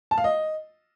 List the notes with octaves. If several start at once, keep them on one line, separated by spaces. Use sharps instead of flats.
A5
F5
D#5